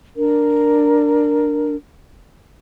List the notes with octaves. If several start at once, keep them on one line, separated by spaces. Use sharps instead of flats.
D4 A#4